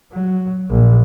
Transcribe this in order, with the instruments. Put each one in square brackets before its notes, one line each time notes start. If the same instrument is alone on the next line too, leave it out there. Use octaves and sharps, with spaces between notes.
[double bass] F#3
A#1